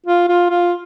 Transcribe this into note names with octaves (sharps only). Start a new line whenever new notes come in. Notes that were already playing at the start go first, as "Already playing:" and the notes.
F4
F4
F4